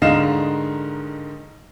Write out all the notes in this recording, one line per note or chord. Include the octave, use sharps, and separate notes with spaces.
G#2 D3 D#3 D#5 F5 E7